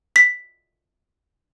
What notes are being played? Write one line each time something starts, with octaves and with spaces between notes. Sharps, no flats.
B6